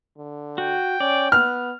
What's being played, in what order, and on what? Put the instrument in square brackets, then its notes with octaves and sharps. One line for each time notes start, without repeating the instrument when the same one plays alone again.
[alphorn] D3
[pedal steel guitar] F#4 [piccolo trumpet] G5
[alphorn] C#4 [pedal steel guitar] D5
[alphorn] B3 [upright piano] F6 [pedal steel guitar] F#6